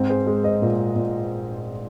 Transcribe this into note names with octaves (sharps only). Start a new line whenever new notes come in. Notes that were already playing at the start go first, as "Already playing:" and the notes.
Already playing: G#2 C4
G#4 C5
G#3
C5 D#5
A#2
A#2